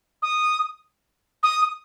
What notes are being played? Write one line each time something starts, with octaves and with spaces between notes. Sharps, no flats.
D#6
D#6